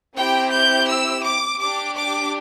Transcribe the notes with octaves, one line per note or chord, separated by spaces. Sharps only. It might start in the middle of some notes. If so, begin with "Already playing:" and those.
C4 E4 G4 G5
G6
E6
D6
D4 G4 D6
D6